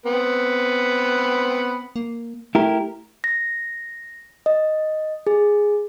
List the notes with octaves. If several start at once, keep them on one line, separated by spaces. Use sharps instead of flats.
B3 C4 B4
A#3
A3 E4 G4 A#4
A#6
D#5
G#4